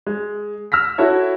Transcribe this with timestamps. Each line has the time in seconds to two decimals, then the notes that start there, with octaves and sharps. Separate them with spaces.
0.07 G#3
0.72 E6 F6 A#6 B6
0.98 E4 F#4 A4 C#5 E5